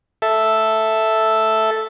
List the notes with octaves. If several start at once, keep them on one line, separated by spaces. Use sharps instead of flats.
A4 E5